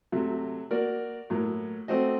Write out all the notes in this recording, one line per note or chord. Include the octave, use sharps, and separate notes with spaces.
C3 F#3 A3
A#3 F#4 A#4 D5
A2 F#3 A#3
A3 C4 F#4 C5 D#5